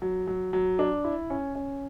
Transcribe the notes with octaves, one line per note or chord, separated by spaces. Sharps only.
F#3
F#3
F#3
D4
E4
C#4
C#4